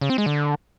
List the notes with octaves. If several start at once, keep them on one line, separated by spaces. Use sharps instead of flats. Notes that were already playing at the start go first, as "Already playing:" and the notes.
C#3
C4
G#3
D3